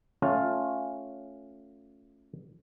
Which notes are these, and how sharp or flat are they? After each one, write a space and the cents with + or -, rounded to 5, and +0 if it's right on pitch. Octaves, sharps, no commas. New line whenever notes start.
A3 +0 C#4 +0 F4 +15